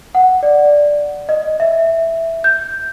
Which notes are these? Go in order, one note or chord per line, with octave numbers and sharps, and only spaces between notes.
F#5
D5
D#5
E5
G6